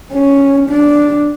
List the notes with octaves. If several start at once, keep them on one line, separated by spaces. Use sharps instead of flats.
C#4
D4